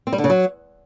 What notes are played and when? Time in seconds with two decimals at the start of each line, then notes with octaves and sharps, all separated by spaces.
0.07 C4
0.13 G3
0.18 D3
0.24 C#3
0.30 F#3